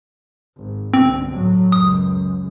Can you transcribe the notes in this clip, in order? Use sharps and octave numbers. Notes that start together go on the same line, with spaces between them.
G#1
G1 C2 C4
A2 F#3
C#2 F#2 D#6